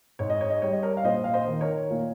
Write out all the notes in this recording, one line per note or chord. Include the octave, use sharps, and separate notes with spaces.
G#2 C#5
D#5
C#5
D#5
G3 C#5
D#5
A#4 C#5
F5
A#1 C5 D#5
F5
C5 D#5
D#3
A#4 C#5
A#2